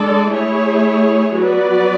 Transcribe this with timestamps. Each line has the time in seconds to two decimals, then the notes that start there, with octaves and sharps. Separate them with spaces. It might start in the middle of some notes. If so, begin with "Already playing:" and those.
Already playing: G#3 D4 A4 D5
0.28 A3 E4 G#4 C#5
1.34 F#3 B3 F#4 B4 D5